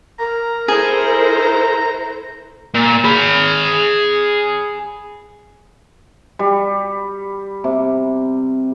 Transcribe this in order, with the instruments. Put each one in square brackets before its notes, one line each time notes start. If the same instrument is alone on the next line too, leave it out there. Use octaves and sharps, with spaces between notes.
[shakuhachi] A#4 [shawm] A#5
[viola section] E4 A4 C5 [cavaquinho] G#4 [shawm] A#5
[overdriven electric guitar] A#2
G#4 B5
[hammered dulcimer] G3
C3